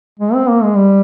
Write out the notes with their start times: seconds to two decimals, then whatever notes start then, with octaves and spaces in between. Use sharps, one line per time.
0.20 G#3
0.34 C4
0.49 A#3
0.63 G#3
0.76 G3